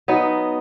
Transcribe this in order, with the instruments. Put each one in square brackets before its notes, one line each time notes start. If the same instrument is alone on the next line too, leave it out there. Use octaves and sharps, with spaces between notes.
[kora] F#3 B3 D#4